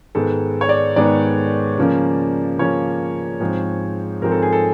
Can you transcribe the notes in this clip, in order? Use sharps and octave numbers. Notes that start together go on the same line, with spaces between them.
G#2 D#3 G#3 B3 A4
C#5
D5
G#2 D#3 G#3 B3 D5
C#3 F3 A#3 C#4
C#3 F3 A#3 C#4 C#5
G#2 F3 G#3 C4
G#2 F3 G#3 C4 A#4
A4
G#4
A4